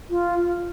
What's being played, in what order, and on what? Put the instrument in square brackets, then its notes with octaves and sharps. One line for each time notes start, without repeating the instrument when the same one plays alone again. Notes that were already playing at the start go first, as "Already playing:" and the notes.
[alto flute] F4